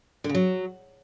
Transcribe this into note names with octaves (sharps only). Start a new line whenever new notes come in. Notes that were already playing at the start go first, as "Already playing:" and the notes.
D3
C#3
F#3